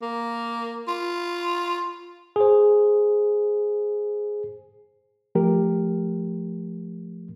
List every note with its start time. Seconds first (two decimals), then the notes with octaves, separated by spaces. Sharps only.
0.02 A#3
0.88 F4
2.36 G#4 C5
5.35 F3 A3 G4 A#4